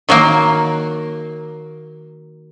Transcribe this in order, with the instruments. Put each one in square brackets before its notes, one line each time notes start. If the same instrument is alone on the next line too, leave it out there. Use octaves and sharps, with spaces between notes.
[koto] D#3 F#3 A#3